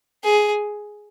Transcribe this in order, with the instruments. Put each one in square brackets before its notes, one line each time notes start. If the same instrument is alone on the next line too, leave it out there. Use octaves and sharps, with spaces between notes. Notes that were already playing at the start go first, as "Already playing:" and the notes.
[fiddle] G#4